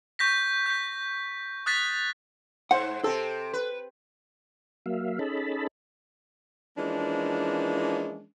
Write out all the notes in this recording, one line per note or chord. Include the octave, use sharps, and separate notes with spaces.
C#6 G6 A#6 B6
G6 B6
D#6 F#6 A6 B6
G#2 C5 F#5
C3 C4 A4
B4
F#3 A#3 E5 F5
C#4 D#4 G#4 A4 A5 B5
E3 F3 G#3 A#3 C#4 D4